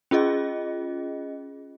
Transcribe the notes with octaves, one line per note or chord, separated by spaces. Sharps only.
C#4 F4 G#4 D#5